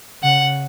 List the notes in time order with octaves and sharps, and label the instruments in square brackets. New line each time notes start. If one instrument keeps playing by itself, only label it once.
[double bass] C#3 [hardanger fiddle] F#5